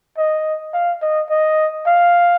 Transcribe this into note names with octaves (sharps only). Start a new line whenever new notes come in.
D#5
F5
D#5
D#5
F5